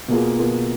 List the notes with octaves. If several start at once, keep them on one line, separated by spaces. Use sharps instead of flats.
B2 A#3 F4 G#4
B2 A#3 F4 G#4